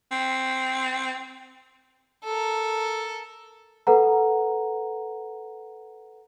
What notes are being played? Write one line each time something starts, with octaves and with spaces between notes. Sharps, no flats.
C4
A4 A#4
A4 B4 F#5 A#5